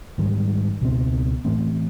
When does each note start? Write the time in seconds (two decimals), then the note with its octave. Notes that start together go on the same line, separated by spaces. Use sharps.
0.18 G#2 D#3 G3
0.81 C#2 B2 G#3 C4
1.45 A2 E3 A3 C4